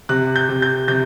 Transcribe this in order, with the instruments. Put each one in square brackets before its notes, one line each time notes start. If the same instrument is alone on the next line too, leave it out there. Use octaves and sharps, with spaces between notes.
[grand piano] C3 F#6
G6
C3
G6
C3 G6